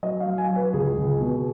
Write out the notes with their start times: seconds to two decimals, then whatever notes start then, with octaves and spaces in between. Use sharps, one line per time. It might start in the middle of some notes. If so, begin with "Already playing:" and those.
0.03 F#3 D#5
0.20 F5
0.26 F#3
0.38 G#5
0.50 F#3
0.56 B4
0.73 C#2 G#4
0.97 C#2
1.21 B2